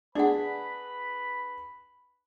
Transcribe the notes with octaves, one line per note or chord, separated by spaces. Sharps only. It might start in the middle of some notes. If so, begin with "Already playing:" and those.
D4 G#4 B4 D5 F#5 B5